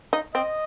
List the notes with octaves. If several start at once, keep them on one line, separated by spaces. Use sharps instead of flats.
D#4
C4 D#5